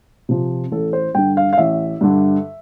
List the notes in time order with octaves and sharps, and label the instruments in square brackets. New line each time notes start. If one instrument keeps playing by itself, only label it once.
[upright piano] C3 F3
A1 A4
C5
G2 D3 G5
F5
F5
A1 E5
G2 D3